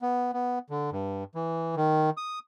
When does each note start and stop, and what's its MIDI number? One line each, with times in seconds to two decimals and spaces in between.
0.02 0.31 59
0.33 0.59 59
0.70 0.90 50
0.92 1.24 43
1.35 1.75 52
1.76 2.10 51
2.17 2.39 87